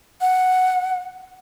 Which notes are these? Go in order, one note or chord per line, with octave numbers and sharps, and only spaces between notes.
F#5